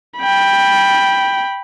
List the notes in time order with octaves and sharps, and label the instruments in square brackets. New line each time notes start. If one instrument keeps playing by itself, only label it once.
[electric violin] G5 B5